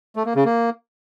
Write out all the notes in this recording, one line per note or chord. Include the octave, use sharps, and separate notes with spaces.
A3
A#3
C#3
A#3